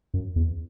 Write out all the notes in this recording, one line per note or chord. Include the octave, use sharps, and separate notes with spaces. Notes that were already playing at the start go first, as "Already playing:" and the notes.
F#2
E2